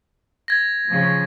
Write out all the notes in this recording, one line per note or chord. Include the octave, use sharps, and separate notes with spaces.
G#6 A#6
C#3 F3